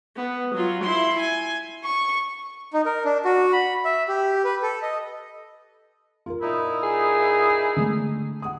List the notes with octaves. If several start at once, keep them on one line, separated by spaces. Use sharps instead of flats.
B3
F#3 F4
E4 C6
G#5
C#6
D#4
A#4
D4
F#4
B5
E5
G4
B4
A4
D#5
F4 A#4
A#2 D#4 E4
G#4
D3 G#3 A3
F#5 D#6